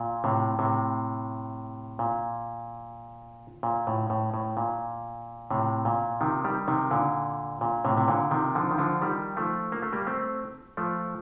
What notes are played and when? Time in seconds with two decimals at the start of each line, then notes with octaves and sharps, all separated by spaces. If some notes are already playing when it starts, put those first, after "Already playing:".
Already playing: A#2
0.24 A2 C3
0.59 A2 C3
1.99 A#2
3.63 A#2
3.87 A2
4.10 A2
4.34 A2
4.57 A#2
5.50 A2 C3
5.85 A#2
6.21 C3 D#3
6.44 D#3 G3
6.68 C3 D#3
6.91 A#2 D3
7.61 A#2
7.85 A2 C3
7.97 C3
8.08 A#2 D3
8.31 C3 D#3
8.55 D3 F3
8.71 D#3
8.78 D3 F3
9.02 D#3 G3
9.37 F3 A3
9.72 A#3
9.82 A3
9.93 G3 A#3
10.07 A3 C4
10.77 F3 A3